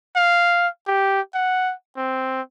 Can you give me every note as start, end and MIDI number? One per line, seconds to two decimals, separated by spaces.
0.16 0.68 77
0.87 1.21 67
1.34 1.73 78
1.97 2.41 60